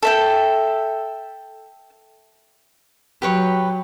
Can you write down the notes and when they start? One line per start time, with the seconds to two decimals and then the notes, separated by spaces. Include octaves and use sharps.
0.03 A4 E5 G5
3.22 F#3 G4 B4 C#5